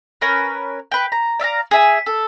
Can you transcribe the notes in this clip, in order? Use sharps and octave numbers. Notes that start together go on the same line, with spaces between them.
C#4 A#4 B4
B4 G5
A#5
D5 E5 F5 A#5
G#4 E5 G#5
A4